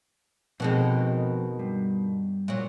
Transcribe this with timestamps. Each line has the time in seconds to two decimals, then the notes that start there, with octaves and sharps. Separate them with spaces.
0.60 F2 B2 D#3 G#3 C4
1.59 G2
2.48 A#2 F#3